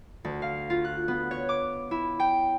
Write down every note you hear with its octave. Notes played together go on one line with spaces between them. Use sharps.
D2
F5
F4
F#6
B3
C#5
D6
E4
G5